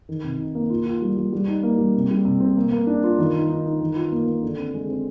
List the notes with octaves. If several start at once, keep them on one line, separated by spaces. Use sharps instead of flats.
D#3
C3
D#4
A#3
F4
F4
G3
G3
G3
D#4
A#3
G3
C3
G3
C3
C4
A#3
A#3
D4
F4
D#3
D#4
D#4
D#4
D#3
F4
A#3
A#3
D3
C4
G#3
C4